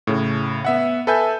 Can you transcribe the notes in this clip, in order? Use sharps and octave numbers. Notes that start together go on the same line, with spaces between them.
A2 C#3
B3 E5 F#5
A4 B4 E5 G#5 G6